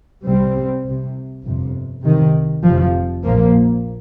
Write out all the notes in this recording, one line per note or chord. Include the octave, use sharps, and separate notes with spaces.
C2 C3 G3 C4
C2
C3
G1 F2 C3
C2 C3 D#3
F1 F2 C3 F3
A#1 A#2 F3 A#3